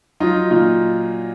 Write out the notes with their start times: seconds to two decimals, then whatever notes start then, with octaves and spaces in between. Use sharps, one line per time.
0.20 F#3 D#4 F4
0.51 A#2 D#4 F4